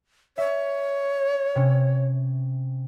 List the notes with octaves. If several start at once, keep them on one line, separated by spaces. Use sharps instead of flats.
C#5 E5
C3 C#4